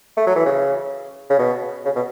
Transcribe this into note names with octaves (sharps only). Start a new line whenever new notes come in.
A3
F#3
E3
C#3
C#3
B2
C#3
B2